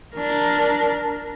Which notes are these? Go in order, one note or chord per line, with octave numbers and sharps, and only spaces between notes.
D4 A#4